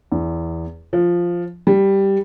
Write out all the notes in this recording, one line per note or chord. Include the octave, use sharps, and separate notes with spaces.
E2
F3
G3